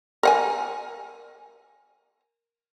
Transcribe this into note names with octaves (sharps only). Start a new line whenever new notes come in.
A#4 F#5 G#5